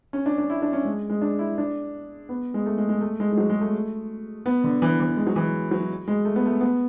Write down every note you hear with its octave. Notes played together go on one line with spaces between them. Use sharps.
C#4
D4
D4
E4
D4
C#4
G#3
G#3
D4
E4
D4
B3
G#3
A3
G#3
G#3
A3
G#3
G#3
F#3
G#3
A3
B3
D3
E3
E3
G#3
F#3
E3
F#3
G#3
A3
B3
A3
B3